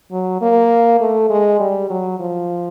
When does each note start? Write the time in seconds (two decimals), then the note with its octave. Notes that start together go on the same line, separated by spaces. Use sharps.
0.11 F#3
0.42 A#3
1.00 A3
1.30 G#3
1.60 G3
1.90 F#3
2.20 F3